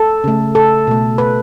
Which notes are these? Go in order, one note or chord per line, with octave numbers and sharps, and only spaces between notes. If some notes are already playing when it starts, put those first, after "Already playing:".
Already playing: A4
C#3 A3
A4
B2 A3
B4